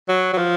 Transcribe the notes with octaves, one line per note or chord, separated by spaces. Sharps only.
F#3
F#3
F3